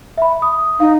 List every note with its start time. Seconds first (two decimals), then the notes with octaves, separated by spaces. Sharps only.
0.18 E5 B5
0.42 D#6
0.80 D#4 F5